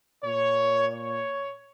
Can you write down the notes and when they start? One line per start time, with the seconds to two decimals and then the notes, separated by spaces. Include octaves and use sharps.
0.24 A#2 C#5
0.92 C#5